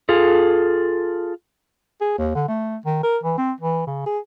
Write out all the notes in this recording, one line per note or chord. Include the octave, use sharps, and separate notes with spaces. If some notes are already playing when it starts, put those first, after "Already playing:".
F4 G#4 A4
G#4
D#2
D3
A3
D#3
A#4
E3
C4
E3
C#3
G#4